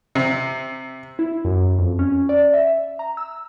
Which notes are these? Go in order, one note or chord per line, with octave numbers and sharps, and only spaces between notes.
C3
E4
F#2
F2
C#4
D5
E5
A#5
E6